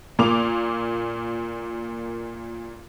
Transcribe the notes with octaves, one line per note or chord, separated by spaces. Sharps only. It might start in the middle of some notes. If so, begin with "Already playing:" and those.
A#2 A#3 D6 F7